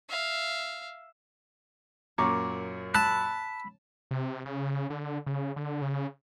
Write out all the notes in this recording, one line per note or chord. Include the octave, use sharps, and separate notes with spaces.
E5 F5
F#2 A#2 C#5 A#5 D6
A5 B5 E6 F#6
C3
C#3
C#3
D3
C#3
D3
C#3